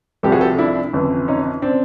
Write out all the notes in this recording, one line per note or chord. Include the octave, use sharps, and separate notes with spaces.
C2 C3 F3 G4 A4
F#4 G#4
G4 A4
D4 E4
G1 F2 C#3 E3
C#4 D#4
C#3 C4 D4